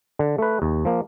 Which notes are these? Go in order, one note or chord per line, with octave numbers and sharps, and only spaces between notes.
D3
A3 B4
D#2
F3 A#3